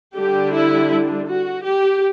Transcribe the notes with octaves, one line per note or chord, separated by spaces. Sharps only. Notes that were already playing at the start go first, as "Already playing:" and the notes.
D3 G3 D4 G4
E4
F#4
G4